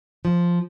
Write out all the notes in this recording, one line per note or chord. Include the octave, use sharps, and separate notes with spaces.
F3